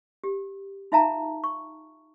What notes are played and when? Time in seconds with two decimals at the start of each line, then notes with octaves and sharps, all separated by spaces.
0.24 G4
0.92 D#4 F4 E5 F5 A5 A#5
1.44 C#6